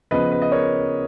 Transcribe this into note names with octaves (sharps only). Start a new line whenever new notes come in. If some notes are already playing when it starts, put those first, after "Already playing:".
C#3 F3 B3 B4 D#5
B4
D#5
A#4 C#5